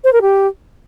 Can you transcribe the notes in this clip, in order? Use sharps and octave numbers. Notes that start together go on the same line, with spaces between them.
C5
A#4
G4